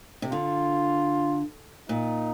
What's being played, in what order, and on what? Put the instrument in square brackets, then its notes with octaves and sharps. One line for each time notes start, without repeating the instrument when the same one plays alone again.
[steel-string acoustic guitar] C3
[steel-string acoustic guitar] D3 [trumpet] F4
[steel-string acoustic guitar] A#2 [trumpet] D#4